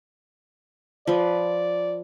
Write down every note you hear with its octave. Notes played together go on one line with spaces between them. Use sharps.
F3 B4 D5